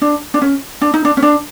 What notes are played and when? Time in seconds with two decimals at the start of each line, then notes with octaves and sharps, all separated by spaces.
0.02 D4
0.34 D4
0.42 C#4
0.82 D4
0.94 D#4
1.05 D4
1.17 C#4
1.23 D4